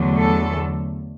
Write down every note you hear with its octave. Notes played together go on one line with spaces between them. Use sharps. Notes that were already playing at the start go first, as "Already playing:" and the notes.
Already playing: E2 D3 F#3 A3
A4